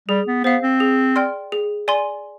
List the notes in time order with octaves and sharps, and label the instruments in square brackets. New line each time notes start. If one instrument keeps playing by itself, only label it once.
[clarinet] G3 [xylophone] G#4
[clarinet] B3
[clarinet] B3 [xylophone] C5 F5
[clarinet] C4
[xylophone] G#4
D5 G5 C6 F6
G#4
D5 G#5 C6